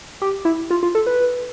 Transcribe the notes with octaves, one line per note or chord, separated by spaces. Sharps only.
G4
E4
F4
F4
A4
B4